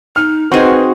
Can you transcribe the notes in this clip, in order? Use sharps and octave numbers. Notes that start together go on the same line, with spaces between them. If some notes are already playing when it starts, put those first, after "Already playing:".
D#4 F6
C4 D#4 F#4 G#4 B4 C5